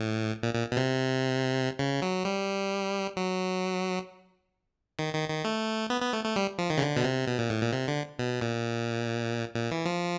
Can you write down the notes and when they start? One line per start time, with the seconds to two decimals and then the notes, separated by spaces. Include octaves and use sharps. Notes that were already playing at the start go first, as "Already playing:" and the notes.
Already playing: A2
0.43 A#2
0.54 A#2
0.72 B2
0.77 C3
1.79 C#3
2.02 F#3
2.25 G3
3.17 F#3
4.99 D#3
5.14 D#3
5.29 D#3
5.45 A3
5.90 B3
6.02 B3
6.13 A3
6.25 A3
6.36 G3
6.58 F3
6.70 D#3
6.78 C#3
6.82 D3
6.96 B2
7.04 C3
7.27 B2
7.39 A#2
7.50 A2
7.61 A#2
7.73 C3
7.88 D3
8.19 B2
8.41 A#2
9.55 A#2
9.71 E3
9.85 F3